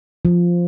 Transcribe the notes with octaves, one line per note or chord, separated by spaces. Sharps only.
F3